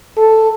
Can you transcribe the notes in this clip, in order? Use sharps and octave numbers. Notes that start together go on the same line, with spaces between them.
A4